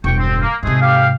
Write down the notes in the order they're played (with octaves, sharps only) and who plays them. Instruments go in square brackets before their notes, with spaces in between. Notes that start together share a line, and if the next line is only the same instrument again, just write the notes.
[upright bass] E1 G2 [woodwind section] G5 C#6
[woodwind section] C4
A#3
[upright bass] G#2 C3 [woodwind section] G#3 A3 G#4
[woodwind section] G4 F5